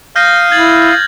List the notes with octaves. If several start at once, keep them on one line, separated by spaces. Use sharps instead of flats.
F5 D#6 F6 G6 A#6
E4 G#6 A6 F#7